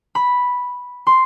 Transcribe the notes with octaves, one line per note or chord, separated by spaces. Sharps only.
B5
C6